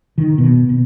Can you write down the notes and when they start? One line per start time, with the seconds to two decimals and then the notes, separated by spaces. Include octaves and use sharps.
0.18 D#3
0.38 B2
0.69 B2